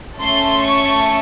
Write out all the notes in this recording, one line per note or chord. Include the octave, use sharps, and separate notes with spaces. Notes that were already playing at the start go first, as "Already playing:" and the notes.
A3 C#4 A4 C6
C#6